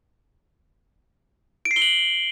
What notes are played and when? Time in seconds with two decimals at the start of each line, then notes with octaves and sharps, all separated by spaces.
1.65 D7
1.71 C7
1.76 G7
1.82 F#7